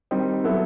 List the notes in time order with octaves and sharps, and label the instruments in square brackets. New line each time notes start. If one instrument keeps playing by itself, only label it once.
[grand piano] D#3 G3 C4 D#4
F#3 B3 E4 A4